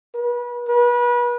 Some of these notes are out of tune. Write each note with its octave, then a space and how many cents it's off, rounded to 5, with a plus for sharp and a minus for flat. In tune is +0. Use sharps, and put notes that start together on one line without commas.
B4 -30
B4 -30